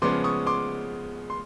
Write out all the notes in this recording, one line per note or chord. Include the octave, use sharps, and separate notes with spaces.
C#3 F3 G#3 B3 C6 D6
C#6 D#6
C6 D6
C6